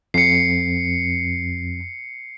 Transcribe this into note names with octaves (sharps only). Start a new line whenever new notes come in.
F2 C7 C#7